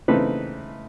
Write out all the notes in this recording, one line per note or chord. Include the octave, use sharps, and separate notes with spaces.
C#3 E3 A3 C4 D#4 B4